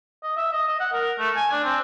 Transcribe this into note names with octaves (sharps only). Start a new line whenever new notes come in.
D#5
E5
D#5
D#5
F#5
A#4
A3
G#5
D4
C4